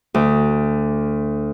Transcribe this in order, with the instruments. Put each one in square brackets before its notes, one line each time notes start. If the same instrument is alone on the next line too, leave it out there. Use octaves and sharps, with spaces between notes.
[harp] D2